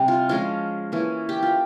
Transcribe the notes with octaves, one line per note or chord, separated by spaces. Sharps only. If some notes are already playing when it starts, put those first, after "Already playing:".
Already playing: C3 G3 C4
F4
F3 G#3 C#4 F4
E3 A#3 C#4
G4
F4